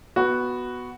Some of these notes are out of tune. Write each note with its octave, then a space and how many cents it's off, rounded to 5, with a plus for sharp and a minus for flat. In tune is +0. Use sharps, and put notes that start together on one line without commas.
B3 +0 F#4 +0